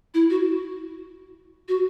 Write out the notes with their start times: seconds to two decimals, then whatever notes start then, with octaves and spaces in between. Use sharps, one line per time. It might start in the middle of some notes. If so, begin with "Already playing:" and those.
0.14 E4
0.30 F#4
1.68 F#4